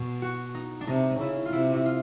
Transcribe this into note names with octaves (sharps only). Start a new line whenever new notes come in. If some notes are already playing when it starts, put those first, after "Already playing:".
Already playing: B2
F#4
D#4
D4
C3 D#4
C#3 E4
F4
C3 E4
F4